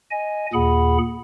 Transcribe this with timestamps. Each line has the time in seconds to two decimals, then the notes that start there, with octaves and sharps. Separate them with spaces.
0.11 D#5 G#5
0.53 D#2 A#2 G#4 F#5 B5